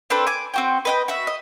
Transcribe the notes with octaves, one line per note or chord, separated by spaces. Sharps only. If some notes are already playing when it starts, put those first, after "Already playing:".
C4 D4 A4 B4
G#5 D6
C4 F#4 G5
B4 D#5 G5
F#4 E5
D#5